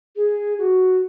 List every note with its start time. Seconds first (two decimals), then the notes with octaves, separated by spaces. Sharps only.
0.16 G#4
0.58 F#4